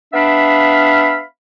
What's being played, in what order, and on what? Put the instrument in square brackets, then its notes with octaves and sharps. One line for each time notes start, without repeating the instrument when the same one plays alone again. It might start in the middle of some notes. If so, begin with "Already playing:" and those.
[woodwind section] B3 D4 E5 F5 B5